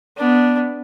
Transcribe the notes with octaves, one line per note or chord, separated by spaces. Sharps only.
B3 D4